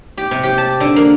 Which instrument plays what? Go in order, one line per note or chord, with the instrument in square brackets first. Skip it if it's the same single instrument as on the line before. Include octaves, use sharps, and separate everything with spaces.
[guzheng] G4
C3
G4
A5
D3
A#3